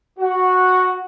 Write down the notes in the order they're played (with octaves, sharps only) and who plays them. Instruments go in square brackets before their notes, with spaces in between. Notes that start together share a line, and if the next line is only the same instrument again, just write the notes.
[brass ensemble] F#4